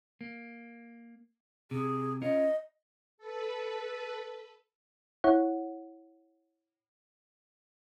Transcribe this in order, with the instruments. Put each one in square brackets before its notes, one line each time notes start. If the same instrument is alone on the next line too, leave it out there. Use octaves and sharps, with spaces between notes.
[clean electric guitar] A#3
[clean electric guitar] C3 [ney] G#4
[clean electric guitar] C#4 F4 A#4 [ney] D#5
[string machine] A4 B4
[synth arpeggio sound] E4 C#5 F#5